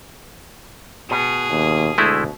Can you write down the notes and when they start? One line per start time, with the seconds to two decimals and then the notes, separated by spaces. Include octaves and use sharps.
1.11 B2 G#4
1.50 D#2
1.98 D2 G#3 A3 E4